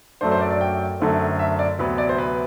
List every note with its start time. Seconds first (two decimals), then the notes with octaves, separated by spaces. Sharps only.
0.21 F#2 F#3 A3 D4 C5
0.32 C5
0.40 D5
0.51 D5
0.61 G5
1.00 F#2 D3 A3 C4
1.39 E5
1.59 D5
1.79 D2 C3 F#3 B3 B4
1.98 D5
2.09 C5
2.18 B4